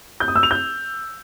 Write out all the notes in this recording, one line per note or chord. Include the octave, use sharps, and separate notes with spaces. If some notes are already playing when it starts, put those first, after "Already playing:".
G6
D#6
E6
F7
G6